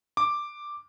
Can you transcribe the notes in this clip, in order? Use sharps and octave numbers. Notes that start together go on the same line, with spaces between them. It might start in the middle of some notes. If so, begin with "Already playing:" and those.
D6